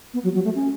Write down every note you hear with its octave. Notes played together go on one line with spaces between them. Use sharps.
B3
F#3
F#3
A3
C#4